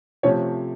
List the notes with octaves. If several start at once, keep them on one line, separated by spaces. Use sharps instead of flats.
C3 F3 A3 C#4 C#5